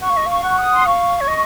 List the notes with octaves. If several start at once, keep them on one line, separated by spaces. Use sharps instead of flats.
F#5 C#6
F5
D#5
F5 C#6
F#5
D#6
C6
F5 C#6
C#5
D#5